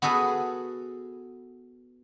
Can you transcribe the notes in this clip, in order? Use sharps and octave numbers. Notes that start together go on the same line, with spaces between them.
B3 F#4 G#4 A4 B4